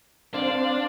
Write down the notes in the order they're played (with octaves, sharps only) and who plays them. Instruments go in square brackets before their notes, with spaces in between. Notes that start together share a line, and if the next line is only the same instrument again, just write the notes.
[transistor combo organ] C4 C5 F5 [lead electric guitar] D4